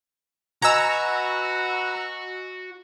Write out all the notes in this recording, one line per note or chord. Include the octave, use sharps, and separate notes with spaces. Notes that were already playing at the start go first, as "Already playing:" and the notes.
F#4 B4 D#5 G#5 A#5 E6 G#6